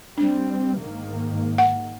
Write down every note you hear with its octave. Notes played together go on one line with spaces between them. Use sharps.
G3 C4 D4
G#2 D#3 A#3
F#5